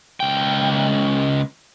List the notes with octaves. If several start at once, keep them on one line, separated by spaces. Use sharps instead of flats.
C#2 G5